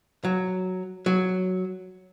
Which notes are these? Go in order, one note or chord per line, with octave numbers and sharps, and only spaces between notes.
F#3
F#3